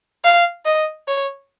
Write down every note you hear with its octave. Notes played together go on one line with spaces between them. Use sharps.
F5
D#5
C#5